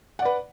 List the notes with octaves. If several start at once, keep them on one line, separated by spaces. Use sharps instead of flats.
B4 D5 F#5